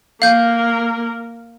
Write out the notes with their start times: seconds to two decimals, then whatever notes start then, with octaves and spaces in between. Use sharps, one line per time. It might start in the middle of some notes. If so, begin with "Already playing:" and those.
0.22 A#3 A#4 F5 G6